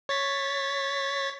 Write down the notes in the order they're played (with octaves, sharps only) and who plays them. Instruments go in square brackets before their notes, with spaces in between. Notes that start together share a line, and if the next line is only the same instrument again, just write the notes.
[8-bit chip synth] C#5 A6 B6